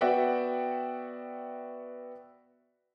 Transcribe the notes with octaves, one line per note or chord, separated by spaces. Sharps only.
B3 F#4 D5 E5 F#5 G5